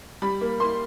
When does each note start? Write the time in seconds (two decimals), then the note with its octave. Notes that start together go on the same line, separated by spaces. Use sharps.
0.22 G3 B5
0.41 A#3
0.60 A#3 C6